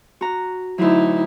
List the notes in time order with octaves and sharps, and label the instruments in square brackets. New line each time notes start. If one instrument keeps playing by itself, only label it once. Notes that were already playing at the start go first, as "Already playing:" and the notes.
[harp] F#4 A#5
[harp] D2 F#3 [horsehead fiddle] D#4 E4